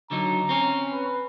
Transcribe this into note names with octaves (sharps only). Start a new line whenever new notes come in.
D3 F#3 D#4 A#5
C4 C#4
B4